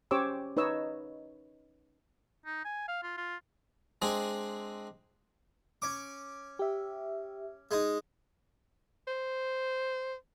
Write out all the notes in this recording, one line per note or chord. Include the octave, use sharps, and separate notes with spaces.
C#4 G4 C5 C#5 D6 E6
D#4 B4 C#5 D#5 E6
D#4
G#5
F5
F4
F4
G#3 C4 D4 G#4
C#4 D6
G4 E5
G#3 D#4
C5